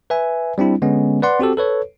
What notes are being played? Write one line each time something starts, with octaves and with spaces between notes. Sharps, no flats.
B4 E5 G#5
G3 C4 D4 E4
D3 G#3 B3 C#4
B4 D5 F#5 C6
C4 F#4 G4 A4
A4 B4 C#5